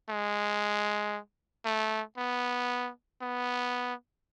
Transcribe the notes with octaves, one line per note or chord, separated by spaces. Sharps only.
G#3
A3
B3
B3